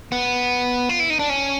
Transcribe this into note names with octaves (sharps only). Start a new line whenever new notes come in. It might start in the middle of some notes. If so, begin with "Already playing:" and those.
B3
F4
E4
D#4
D4
C#4